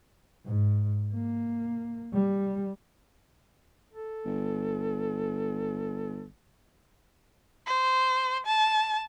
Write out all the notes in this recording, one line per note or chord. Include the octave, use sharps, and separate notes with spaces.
G#2
A#3
G3
A4
G1
C5
A5